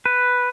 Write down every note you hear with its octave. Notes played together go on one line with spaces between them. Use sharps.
B4